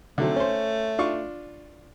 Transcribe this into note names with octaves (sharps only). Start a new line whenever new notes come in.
D3 F#3 A3 C4
C#4 C5
D4 F4 C#6